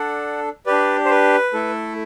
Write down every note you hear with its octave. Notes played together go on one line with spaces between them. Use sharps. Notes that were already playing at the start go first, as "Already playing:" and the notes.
Already playing: D4 A4 D5 F#5
D4 G4 B4 D5
C5
B4
A3 E4 A4